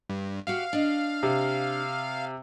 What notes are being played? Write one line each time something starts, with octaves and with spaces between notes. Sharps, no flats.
G2
F#4 G4 E5 F5
D4 D#5
C3